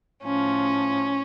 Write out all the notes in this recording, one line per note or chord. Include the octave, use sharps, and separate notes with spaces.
A2 F3 C#4